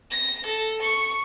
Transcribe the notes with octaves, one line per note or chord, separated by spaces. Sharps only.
A#6
A4
C#6